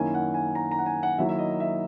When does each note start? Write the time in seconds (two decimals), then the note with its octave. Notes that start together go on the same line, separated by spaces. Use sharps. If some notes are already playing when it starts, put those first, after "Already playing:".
Already playing: F#2 D#3 A#3 C#4 E4 G#5
0.14 F#5
0.34 G#5
0.55 A#5
0.71 A#5
0.79 F#5
0.86 G#5
1.03 F#5
1.18 D#3 F#3 A#3 E4 E5
1.29 E5
1.38 D#5
1.60 E5